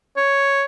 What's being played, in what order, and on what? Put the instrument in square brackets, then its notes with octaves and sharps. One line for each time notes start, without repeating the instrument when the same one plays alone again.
[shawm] C#5